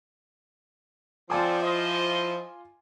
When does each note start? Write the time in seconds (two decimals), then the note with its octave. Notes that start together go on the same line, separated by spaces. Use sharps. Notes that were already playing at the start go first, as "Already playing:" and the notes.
1.30 F3 C4 F4 A4 D5 G#5 D6
1.62 E4 C5 D#5